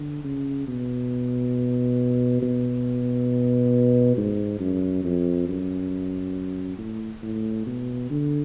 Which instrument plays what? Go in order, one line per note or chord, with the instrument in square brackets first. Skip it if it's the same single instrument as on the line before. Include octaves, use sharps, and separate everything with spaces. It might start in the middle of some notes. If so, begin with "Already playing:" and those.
Already playing: [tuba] D3
C#3
B2
B2
G#2
F#2
F2
F#2
A2
A2
B2
D3